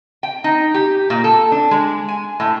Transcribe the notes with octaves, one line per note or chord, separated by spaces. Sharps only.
G5
D#4
G4
A#2
A4
D4
G#3
G#5
A2